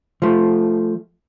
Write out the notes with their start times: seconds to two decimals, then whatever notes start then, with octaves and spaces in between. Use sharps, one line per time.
0.22 F3 A3